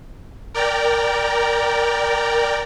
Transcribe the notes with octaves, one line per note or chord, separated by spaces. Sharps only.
A#4 D5 G5 A#5